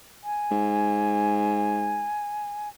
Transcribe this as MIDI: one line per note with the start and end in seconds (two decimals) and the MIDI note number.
0.24 2.69 80
0.51 2.08 44